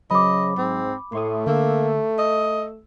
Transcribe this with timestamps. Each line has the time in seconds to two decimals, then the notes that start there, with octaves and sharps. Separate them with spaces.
0.11 C#3 F#3 C5 D#5 B5 D6
0.57 G#2 C4
1.13 A2 A3 C6 C#6 D#6
1.47 D3 A#3 E6
2.19 D#5 E6